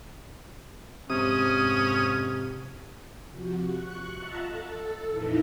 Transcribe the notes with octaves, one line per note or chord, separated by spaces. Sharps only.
F2 G#2 C3 C#4 D#6
C3 F3 F#4
C#6 F#6
F4 D#5 E5 F#5 A5 A#5
A4
F2 A#2 E3 A#3 D#4 E4